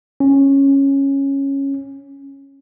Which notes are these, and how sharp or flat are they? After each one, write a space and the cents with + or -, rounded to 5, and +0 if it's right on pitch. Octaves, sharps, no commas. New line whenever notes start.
C#4 -10